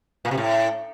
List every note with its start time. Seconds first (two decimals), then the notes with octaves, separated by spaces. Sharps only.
0.25 A#2
0.31 C3
0.38 A2